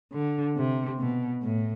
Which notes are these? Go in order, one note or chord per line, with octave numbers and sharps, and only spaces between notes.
D3
C3
B2
A2